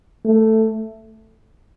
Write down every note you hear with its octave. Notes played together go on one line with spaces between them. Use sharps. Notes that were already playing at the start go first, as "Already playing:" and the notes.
A3